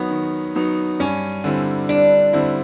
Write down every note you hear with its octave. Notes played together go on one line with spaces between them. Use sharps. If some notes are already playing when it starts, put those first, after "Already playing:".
Already playing: D#3 F#3 B3 D#4
D#3
F#3 B3 D#4
G2 C#4
D3 G3 C4 E4
G2 D4
D3 G3 C4 E4